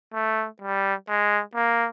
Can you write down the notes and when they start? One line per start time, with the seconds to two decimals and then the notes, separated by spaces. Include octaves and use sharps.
0.14 A3
0.61 G3
1.08 G#3
1.55 A#3